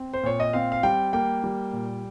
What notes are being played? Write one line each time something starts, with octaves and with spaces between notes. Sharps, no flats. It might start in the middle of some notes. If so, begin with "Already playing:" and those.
Already playing: C4
C5
A#2 C#5
D#5
C4 F5
F5
G3 G5
A#3 G5
G3
A#2